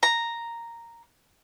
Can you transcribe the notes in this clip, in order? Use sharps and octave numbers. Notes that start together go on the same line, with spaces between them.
A#5